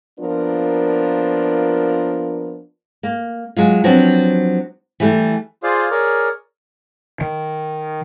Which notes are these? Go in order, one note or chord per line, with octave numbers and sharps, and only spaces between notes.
F3 A#3 B3 D4 F4 A#4
A#3
F#3 G#3 F4
F3 F#3 B3 C4 D4
E3 G3 A3 G4
F4 G#4 C5 D5 F5
G#4 A#4 C#5 D5
D#3